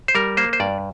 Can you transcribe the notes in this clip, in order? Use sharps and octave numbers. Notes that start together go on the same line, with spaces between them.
C5
G3 A#4
A#3 C5
C5
G2 D5